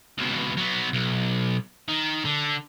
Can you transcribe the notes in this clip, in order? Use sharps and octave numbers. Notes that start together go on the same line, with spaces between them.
C#2 B2
F#3 B3
B1
D#3
D3